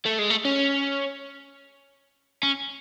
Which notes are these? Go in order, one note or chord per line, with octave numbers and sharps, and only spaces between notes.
A3
G#3
A3
C#4
C#4